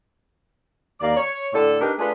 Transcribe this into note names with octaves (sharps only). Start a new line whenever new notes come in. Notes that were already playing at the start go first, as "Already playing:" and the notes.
D#2 A#3 D5
C#5
A2 D3 A4
D4 D#4 G4 A#4 B4
A3 D4 F4 G#4 B4